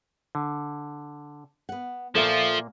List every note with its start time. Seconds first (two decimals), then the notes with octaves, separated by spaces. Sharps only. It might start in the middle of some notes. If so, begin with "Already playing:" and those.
0.35 D3
1.69 B3 F#5
2.15 A#2 F3 A#3 A4 E5 F5